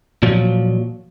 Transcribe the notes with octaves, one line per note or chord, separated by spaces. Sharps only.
A#2 F3 F#3